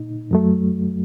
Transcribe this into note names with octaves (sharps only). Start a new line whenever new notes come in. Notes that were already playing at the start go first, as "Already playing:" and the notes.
Already playing: A#2 D#4
F#2 F#3 A3